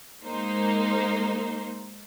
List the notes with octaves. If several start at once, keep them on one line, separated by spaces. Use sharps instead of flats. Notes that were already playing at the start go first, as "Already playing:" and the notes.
G#3 A#3 D#4 C5